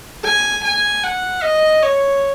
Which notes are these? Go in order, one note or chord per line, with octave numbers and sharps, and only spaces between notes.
G#5
G#5
F#5
D#5
C#5